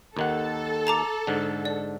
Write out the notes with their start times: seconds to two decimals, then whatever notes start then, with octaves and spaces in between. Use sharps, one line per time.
0.17 D#2 D#3 A4 F#5
0.87 A5 A#5 D6
1.27 G#2 D3
1.65 D5